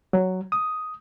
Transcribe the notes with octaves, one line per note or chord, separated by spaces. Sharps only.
F#3
D#6